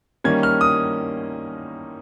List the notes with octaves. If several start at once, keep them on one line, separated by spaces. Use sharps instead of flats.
D#3 G3 A#3 C#4 G#6
F6
D#6